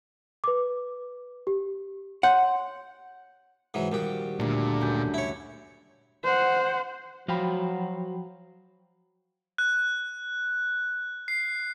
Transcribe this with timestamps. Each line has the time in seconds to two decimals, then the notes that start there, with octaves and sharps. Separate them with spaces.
0.44 B4 D6
1.47 G4
2.23 C#5 F#5 C6 G6
3.74 G#2 E3 F#3
3.92 A#1 D#2 G3 F#4 G4
4.40 D2 A#2 D3 D4
4.81 F#2 G6
5.14 E4 C#5
6.24 C5 F#5
7.28 F3 F#3 F#4 C5 F5 G5 B5
9.58 F#6
11.28 C7